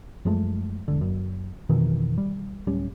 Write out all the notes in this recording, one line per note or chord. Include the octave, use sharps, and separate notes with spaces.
F#2 F3 G#3 A3
E1 B1 D3
F#1 F#2
F2 B2 D#3 E3
G3
D1 G3 C#4